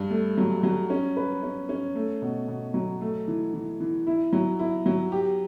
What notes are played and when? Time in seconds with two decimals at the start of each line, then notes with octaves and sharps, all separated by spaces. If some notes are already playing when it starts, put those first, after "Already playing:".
Already playing: G2
0.10 A3
0.38 F#3
0.63 F#3
0.90 C#4
1.17 B4
1.43 C#4
1.69 C#4
1.95 A3
2.22 B2
2.48 B2
2.74 F#3
3.01 A3
3.28 E3
3.54 E3
3.80 E3
4.07 E4
4.33 F#3
4.59 E4
4.86 F#3
5.12 G4